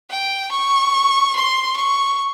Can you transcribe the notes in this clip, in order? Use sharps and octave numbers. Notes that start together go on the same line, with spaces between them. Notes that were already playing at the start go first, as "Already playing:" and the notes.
G5
C#6
C6
C#6